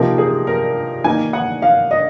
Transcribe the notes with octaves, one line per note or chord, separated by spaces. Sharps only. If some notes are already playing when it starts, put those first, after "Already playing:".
Already playing: C3 F3 A#3 D#4 A#4
G#4
A#4
D#3 A#3 D#4 G#5
F#5
F5
D#5